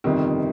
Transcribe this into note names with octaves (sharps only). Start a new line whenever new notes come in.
G1 F2 C3 D#3